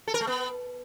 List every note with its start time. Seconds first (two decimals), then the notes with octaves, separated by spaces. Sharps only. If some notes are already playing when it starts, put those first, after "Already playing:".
0.08 A4
0.14 A#4
0.21 A3
0.27 B3